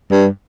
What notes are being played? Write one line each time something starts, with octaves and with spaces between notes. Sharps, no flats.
G2